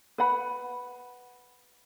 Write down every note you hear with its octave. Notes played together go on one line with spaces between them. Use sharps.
B4 F#5 B5